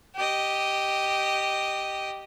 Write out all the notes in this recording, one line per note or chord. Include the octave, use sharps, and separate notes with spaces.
G4 D#5